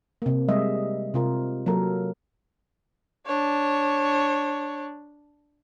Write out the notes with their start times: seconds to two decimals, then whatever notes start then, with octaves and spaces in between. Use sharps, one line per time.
0.22 C3 A#3
0.49 G3 G#3 D#5 E5
1.14 C3 F4 A#4
1.66 F#3 A#3 A4 A#4
3.26 D4 C#5